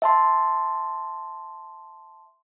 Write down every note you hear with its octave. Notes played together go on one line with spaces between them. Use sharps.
E5 A5 C6